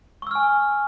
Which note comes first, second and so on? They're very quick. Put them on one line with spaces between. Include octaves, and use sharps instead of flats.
C#6 E6 F6 G#5